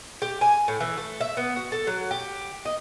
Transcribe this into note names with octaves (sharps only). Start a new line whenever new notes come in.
G4
G#5
A2
E3
A3
E5
B3
F#4
A4
F#3
G4
D#5